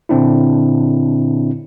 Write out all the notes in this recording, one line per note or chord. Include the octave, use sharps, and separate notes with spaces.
A#2 D3 C4 D4 E4